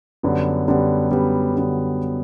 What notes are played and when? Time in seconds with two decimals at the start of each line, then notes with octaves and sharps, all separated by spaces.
0.23 F#2 D3 G3 B3
0.68 F#2 D3 G3 B3
1.11 F#2 D3 G3 B3
1.56 D3 G3 B3